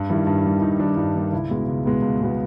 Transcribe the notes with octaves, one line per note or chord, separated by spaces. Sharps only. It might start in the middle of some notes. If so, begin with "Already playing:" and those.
Already playing: G2
D#3 G3 E4
G2
D#3 G3
G2 D#4
D#3 G3 D4
G2 D#4
D#3 G3
C#2 E4
B2 G#3 B3
C#2
B2 G#3 B3
C#2
B2 G#3 B3